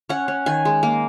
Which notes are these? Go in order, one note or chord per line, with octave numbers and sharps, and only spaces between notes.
C#4 F#5
C#4
D#3 G#5
G#3
A#3